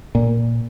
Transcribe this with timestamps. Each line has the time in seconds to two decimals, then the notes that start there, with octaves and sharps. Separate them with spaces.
0.15 A#2